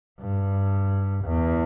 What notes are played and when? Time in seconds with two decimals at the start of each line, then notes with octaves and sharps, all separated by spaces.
0.20 G2
1.24 E2